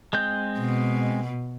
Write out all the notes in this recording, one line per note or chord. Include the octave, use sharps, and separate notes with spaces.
G#3 C4 G6
B2